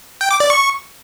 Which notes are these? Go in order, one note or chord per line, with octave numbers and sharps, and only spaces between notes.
G5
D6
D5
C#6